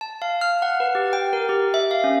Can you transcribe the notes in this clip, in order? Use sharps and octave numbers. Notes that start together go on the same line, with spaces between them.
A5
F5
F6
F#5
B4
G4
G5
A#4
G4
E5
F5
C#4